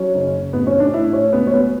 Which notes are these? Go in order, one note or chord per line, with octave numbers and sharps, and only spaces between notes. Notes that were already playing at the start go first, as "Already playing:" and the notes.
Already playing: F#3 C#4
F#1
F#1
A1 B3
C#4
A2
D4
A2 E4
A2 C#4
C#2 B3
C#4
F#3 B3